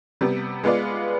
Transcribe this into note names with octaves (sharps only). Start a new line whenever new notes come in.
C3 G3 B3
G#3 B3 F4 B4 D5